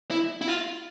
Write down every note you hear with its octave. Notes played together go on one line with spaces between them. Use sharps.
E4
E4
F4